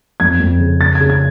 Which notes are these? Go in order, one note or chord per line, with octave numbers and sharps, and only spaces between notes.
F2 G#6
F2
C#3
C#3 A6
G#6
C#3
G#6